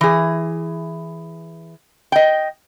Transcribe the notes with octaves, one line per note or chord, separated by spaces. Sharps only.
E3 G#4
D#5 G5